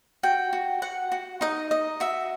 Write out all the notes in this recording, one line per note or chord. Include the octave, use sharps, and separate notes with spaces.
F#4 G5
F#4
F#4 F#5
F#4
D#4 D#5
D#5
F#4 E5